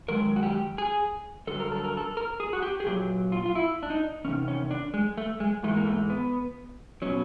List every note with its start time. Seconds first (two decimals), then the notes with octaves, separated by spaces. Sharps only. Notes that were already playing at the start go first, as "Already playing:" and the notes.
0.08 F#2 D#3 G#3 A#4
0.36 F#4
0.43 G4
0.78 G#4
1.47 G2 D3 F#3 A4
1.60 A#4
1.72 A4
1.84 A#4
1.97 A4
2.17 A#4
2.40 G#4
2.53 F#4
2.62 G4
2.80 G#4
2.86 A#2 F#3 G4
3.32 F4
3.46 F4
3.55 E4
3.83 D4
3.90 D#4
4.24 E2 C3 D#3 C#4
4.48 C#4
4.71 D4
4.94 G#3
5.18 A3
5.40 G#3
5.63 G#2 E3 G#3 A3
5.77 A#3
5.86 A3
6.10 B3
7.02 B2 F#3 C#4